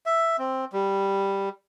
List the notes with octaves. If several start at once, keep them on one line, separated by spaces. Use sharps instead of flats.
E5
C4
G3